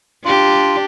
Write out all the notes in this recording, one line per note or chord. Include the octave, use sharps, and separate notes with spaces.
D4 F4 G4